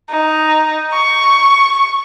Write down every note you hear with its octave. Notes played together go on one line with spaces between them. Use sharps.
D#4
C#6